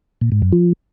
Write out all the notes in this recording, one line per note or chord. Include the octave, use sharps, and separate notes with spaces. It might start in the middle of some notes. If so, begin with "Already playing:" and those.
A#2
G#2
F#2
F3